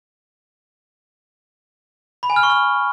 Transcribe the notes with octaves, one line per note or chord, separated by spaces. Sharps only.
B5
G#5
F6
C#6
F6